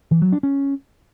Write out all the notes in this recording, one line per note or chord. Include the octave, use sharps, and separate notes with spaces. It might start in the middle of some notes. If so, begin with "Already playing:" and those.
E3
F#3
D4
C#4